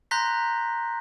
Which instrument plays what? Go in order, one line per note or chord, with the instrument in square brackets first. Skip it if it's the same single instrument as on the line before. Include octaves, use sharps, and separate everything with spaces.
[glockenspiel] A#5 C6 F#6 G6 A#6 B6